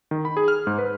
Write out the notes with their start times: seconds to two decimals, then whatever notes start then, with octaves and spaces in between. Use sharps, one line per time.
0.11 D#3
0.25 B5
0.37 G#4
0.48 F6
0.67 G#2
0.79 B4